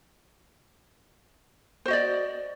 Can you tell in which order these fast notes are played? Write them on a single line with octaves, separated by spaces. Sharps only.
C5 F#4 D#5 D5